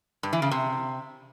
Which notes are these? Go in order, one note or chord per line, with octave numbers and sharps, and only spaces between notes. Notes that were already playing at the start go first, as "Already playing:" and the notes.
G2
E3
C#3
C3